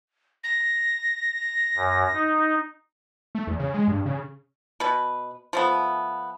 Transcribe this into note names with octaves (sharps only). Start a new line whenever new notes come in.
A#6
F#2
D#4
A3
E2
C#3
G#3
G2
C#3
B2 B4
F3 A3 B3